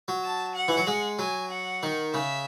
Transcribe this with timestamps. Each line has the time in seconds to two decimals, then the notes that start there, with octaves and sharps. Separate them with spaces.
0.08 F#3
0.24 A5
0.55 F#5
0.68 E3
0.77 F#3
0.87 G#3
1.19 F#3 G#5
1.51 F#5
1.83 D#3
2.14 C#3 E5